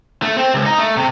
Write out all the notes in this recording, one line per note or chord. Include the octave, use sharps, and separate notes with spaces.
A3
C4
C#2
D#4
A3
C3